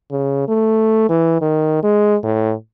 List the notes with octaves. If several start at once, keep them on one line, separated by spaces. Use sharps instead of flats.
C#3
A3
E3
D#3
G#3
A2